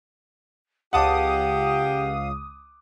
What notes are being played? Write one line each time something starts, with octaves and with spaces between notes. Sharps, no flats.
C#2 G4 F5 F#5 A5 D6 D#6